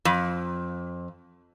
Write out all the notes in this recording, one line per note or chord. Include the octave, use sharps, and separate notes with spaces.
F2